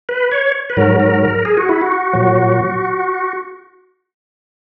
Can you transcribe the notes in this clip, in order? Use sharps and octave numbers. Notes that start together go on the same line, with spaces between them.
B4
C#5
B4
G#2 F#3 A#4
A#4
A#4
G#4
F#4
E4
F#4
A#2 F#3